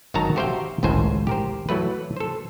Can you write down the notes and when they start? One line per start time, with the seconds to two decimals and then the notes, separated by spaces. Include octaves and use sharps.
0.14 G#1 D#3 F#3 C#5 A5 A#5
0.36 F#4 G4 C5 E5 F5 G5
0.83 G#1 C#2 A2 C5 G#5
1.27 G4 A#4 C5
1.69 E3 F#3 A3 B4
2.17 A4 C5